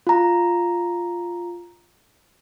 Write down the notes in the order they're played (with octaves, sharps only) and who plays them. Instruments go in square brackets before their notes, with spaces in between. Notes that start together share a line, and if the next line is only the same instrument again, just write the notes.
[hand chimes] F4 A#5